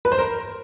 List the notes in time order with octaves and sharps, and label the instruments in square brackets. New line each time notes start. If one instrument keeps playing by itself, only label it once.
[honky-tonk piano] B4
C5
A#4